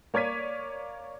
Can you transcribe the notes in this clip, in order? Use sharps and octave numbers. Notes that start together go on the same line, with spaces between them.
A#3 C#5 D5 G#6 B6 D#7